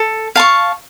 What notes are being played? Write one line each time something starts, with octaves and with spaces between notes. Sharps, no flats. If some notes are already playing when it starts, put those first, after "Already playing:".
Already playing: A4
F5 A5 C#6